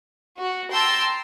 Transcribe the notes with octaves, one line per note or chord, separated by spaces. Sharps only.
F#4
G5 A5 A#5 C6 E6